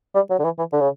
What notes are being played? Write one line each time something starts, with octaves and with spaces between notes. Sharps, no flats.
G3
F#3
D3
E3
E3
D3
C#3